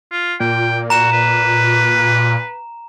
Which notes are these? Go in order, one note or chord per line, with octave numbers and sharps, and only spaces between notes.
F4
A#2 G5
F#4 A#5 E7
B4